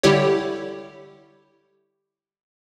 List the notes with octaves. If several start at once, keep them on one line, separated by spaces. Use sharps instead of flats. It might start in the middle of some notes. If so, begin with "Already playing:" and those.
D3 G3 E4 G4 C#5